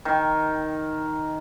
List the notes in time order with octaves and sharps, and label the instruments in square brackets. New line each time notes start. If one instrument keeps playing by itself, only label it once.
[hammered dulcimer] D#3